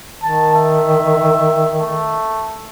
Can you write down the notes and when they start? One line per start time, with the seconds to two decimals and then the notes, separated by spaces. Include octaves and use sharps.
0.22 D#3 A5
0.55 E5
1.80 A3